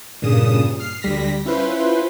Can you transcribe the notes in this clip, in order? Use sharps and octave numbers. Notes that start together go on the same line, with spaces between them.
G2 A#2 C#3 D#6 E7
F6 C7
D2 G3 A#6 B6
C#4 E4 F4 B4 C5